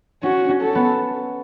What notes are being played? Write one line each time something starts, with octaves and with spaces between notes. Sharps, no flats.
C#4 F#4
C#4
A4
B3